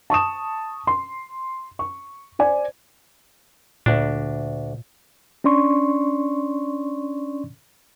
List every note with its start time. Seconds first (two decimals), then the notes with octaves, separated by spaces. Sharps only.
0.10 A5 C#6 D#6 E7
0.87 C6
1.79 C#6
2.39 C5 D5 G#5
3.86 D2 A#2 D4
5.44 C#4 D4 D5 C6 C#6